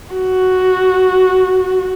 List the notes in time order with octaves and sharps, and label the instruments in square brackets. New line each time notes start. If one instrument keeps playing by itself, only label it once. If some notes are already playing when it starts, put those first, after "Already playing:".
[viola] F#4